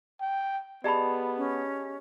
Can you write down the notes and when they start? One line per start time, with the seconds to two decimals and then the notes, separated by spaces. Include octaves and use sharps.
0.20 G5
0.84 B3 G4 G#4 D5 D#5 A5 B5
1.37 C#4